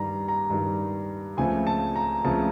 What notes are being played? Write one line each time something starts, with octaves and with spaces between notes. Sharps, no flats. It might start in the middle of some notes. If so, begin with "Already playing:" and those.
Already playing: G2 D#3 G3 A#5
A#5
G2 D#3 G3
C#2 C#3 F3 A3 C4 G#5
A5
A#5
C#2 C#3 F3 A3 C4 A5